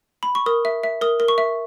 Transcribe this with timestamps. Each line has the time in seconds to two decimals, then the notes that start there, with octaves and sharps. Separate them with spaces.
0.23 B5
0.35 C#6
0.46 A#4 D#6
0.65 E5
0.83 E5
1.01 A#4 D#6
1.20 A#4
1.28 C#6
1.38 E5